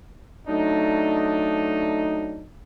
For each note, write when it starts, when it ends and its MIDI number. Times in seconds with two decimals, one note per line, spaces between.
0.48 2.46 54
0.48 2.46 57
0.48 2.46 62
0.48 2.46 63